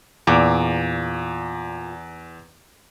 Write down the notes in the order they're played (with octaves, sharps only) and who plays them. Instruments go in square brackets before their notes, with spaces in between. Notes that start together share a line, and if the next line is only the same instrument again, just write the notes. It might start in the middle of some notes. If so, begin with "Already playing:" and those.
[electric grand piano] E2 D6 [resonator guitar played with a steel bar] A#2